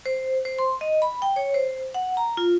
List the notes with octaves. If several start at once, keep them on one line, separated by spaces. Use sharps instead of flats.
C5
C5
C6
D#5
B5
G5
C#5
C5
F#5
A#5
F4